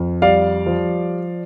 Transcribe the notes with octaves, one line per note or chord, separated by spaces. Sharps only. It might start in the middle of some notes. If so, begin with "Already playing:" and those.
Already playing: F2
G3 D5 F5
F3